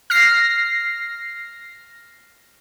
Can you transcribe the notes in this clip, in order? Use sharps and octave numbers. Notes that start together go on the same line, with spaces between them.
F6 A#6 C7